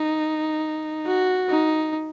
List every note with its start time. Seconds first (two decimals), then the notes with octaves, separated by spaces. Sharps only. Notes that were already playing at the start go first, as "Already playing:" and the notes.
Already playing: D#4
1.06 F#4
1.49 D#4